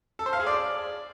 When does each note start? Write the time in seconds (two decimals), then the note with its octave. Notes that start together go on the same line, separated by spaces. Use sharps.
0.19 A4
0.26 C5
0.33 F5
0.40 G#4
0.47 D5